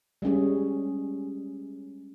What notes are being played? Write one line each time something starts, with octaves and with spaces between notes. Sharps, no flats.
G3 G#3 C#4 G#4